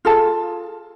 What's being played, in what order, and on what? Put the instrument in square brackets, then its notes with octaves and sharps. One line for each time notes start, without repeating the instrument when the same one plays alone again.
[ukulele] F4 G#4 A4 A5